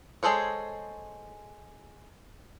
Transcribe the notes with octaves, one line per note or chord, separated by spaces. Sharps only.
G#3 G#4 A4 C5 C#5